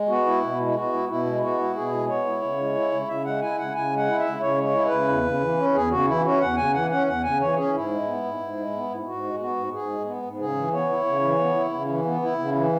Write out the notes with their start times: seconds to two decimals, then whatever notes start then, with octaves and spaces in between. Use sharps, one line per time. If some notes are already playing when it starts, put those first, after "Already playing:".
Already playing: G#3
0.09 B3 F#4
0.26 E4
0.42 B2
0.59 G#3
0.68 E4
0.75 B3 F#4
0.92 E4
1.08 B2 E4
1.26 G#3
1.42 B3 F#4
1.58 E4
1.75 B2 G#4
1.92 G#3
2.08 B3 C#5
2.25 E4
2.42 C#3
2.58 G#3
2.75 E4
2.92 C#3
3.08 C#3 E5
3.25 G#3 F#5
3.41 E4 G#5
3.58 C#3 F#5
3.75 C#3 G#5
3.92 G#3 F#5
4.08 E4
4.19 E5
4.25 C#3
4.40 C#3 C#5
4.57 G#3
4.63 C#5
4.74 E4
4.86 B4
4.91 C#3
5.08 E2
5.24 C#3
5.40 E3
5.57 C#4
5.74 E2 G#4
5.91 C#3 F#4
6.07 E3 E4
6.24 C#4 F#4
6.40 E2 F#5
6.57 C#3 G#5
6.73 E3 F#5
6.90 C#4 F#5
7.07 E2 F#5
7.23 C#3 G#5
7.40 E3 C#5
7.57 C#4 G#4
7.73 G#2 E4
7.90 G#3
8.07 B3
8.24 G#2
8.40 G#2
8.57 G#3
8.73 B3
8.90 G#2
9.07 G#2 F#4
9.23 G#3
9.39 B3 F#4
9.56 G#2
9.73 G#2 G#4
9.89 G#3
10.06 B3
10.22 G#2
10.39 C#3 G#4
10.56 E3
10.72 B3 C#5
10.89 E4
11.06 C#3
11.23 E3
11.39 B3
11.55 E4
11.72 C#3
11.89 E3
12.05 B3
12.22 E4
12.39 C#3
12.55 E3